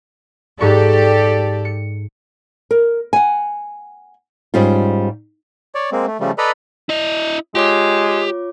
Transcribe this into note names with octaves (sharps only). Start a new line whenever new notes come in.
G#2 G4 A4 D5 C#6
C#7
A#4
F#5 G#5
G#2 G3 C#4 F4
C#5 D5
G#3 A#3 C4
A3
C#3 F3 G3 A3
A4 B4 D5 D#5 A#5 B5
E4 D#5
G#3 F4 G4 C#5 D6